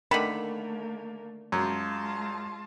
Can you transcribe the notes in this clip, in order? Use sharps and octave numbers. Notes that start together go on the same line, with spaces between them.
D3 D#3 A3 A#3 B5
F#2 G#3 F4 A5